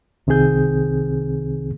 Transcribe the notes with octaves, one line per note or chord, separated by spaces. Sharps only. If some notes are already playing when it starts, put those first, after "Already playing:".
C2 C3 D#3 C4 G#4 G6